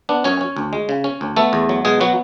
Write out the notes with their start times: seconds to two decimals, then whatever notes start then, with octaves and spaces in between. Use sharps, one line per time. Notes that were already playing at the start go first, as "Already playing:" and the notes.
0.09 B3 D4
0.24 F#2 C#4 C#5
0.41 C#4
0.57 D2
0.73 G#3
0.89 C#3
1.04 C#4
1.21 D2
1.36 A3 B3 A4
1.53 E2
1.69 F#3
1.85 B2 G#3 G#4
2.01 F#3 B3 F#4